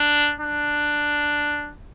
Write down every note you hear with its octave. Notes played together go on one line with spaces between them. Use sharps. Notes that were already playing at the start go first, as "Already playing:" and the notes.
Already playing: D4
D4